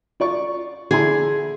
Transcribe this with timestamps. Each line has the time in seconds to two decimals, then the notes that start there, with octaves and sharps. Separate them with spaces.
0.20 F4 D5 C#6
0.91 D3 E4 G#4 C6